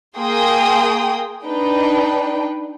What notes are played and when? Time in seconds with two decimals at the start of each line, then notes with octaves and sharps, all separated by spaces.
0.17 A#3 G#4 G5 C6 D#6
1.45 D4 D#4 B4 G5